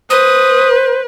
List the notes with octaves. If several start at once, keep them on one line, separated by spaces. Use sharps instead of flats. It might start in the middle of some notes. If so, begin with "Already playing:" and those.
B4 C5 D#6